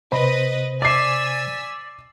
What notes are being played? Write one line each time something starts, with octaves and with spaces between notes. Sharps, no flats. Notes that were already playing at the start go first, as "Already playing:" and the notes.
C3 B4 C5 D#5 B5
D5 G#5 D6 E6 B6 C7